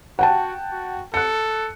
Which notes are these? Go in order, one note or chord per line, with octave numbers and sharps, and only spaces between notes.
F#4 F#5 G5 A5
F#4
A4 F#6 C#7